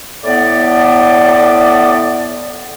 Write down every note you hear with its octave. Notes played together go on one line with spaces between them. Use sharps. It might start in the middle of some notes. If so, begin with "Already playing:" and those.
A2 B3 D5